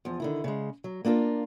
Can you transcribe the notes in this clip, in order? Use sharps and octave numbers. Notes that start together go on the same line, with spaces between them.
E2 F3
D3 D#3 E4
C#3 G#3
F#3
A#3 D4 F4 A4 A#4